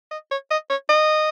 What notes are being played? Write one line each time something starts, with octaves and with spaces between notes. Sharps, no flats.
D#5
C#5
D#5
C#5
D#5